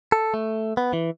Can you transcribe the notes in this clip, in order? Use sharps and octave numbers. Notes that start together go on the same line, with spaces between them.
A4
A3
B3
E3